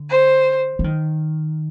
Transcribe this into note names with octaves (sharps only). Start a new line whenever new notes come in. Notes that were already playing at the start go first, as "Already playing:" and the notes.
Already playing: D3
C5
F3
D#3